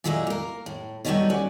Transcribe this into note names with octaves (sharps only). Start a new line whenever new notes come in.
A#2 F#3 G#3 A3 D#4 E4
A#3 A#4
A2
F#3 G3 A3 B3 D#4 C#5
C#4 F#4 C#5 D5